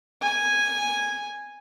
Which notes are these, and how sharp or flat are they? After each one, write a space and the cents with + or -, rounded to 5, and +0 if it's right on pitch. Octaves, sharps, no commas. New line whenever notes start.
G#5 -10